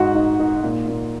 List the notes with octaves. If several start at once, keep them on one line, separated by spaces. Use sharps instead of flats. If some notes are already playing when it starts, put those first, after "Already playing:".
Already playing: G#2 G#3 F#4 F#5
D#4
D#4
A#2
A#2